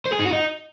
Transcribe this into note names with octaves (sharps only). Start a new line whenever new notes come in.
C5
G#4
D#4
F#4
D#4